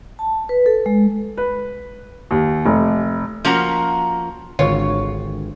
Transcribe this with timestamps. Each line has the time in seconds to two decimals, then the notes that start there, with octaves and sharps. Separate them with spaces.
0.19 A5
0.49 B4
0.66 A4
0.86 G#3
1.37 B4
2.31 D#2
2.65 F1
3.45 F3 A#3 C#4 F#4 A#4 A#5
4.59 G#1 D3 F4 C#5